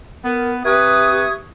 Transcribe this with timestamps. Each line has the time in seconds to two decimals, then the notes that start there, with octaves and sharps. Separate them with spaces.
0.24 B3 A#4
0.65 C3 G4 B4 E5 C#6 D#6 G#6